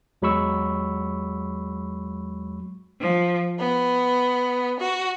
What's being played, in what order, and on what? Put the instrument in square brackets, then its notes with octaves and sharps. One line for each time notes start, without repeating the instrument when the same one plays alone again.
[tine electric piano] E2 F#3 G#3 B5 C#6 E6
[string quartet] F3
B3
F#4